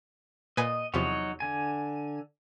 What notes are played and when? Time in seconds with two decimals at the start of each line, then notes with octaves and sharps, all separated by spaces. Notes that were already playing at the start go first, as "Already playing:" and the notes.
0.57 A#2 B4 D#5 G#5
0.94 E2 C3 F3 F#3 D#4 C#5
1.40 D3 G#5